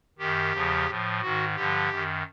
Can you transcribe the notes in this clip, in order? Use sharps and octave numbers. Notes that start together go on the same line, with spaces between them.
F#2 D#3 G4
E2 C#3 F3
A2 F3
G#2 D#3 F#4
G2 D3 F3 G4
F#2 D#3